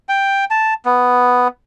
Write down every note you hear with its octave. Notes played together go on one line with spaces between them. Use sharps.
G5
A5
B3